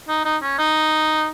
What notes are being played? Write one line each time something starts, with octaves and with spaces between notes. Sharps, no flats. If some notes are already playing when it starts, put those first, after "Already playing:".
D#4
D#4
C#4
D#4